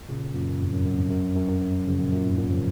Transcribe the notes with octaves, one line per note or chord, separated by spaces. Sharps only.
A#2 C#3
F#2 A#2
F2 G#2
F#2
F#2
F2
F#2
F2
F#2
F#2
F#2
C#3 F3
F#2 A#2
F#2 A#2
F2 G#2
F#2 A#2
C#3 F3